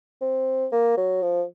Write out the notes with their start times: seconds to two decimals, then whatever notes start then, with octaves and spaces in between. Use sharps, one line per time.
0.21 C4
0.72 A#3
0.97 F#3
1.23 F3